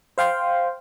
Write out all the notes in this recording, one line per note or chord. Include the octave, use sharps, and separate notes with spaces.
C5 F5 G5 C6